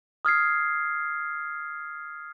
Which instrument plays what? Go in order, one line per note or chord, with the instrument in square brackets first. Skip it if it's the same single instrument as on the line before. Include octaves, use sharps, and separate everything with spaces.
[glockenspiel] D#6 F6 G#6 C7